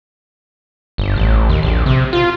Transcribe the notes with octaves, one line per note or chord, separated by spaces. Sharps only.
G1
A1
D#2
A#1
C3
F4